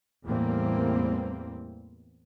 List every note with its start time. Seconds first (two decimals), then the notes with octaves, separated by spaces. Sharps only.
0.24 E2 A2 E3 G3 A#3 C4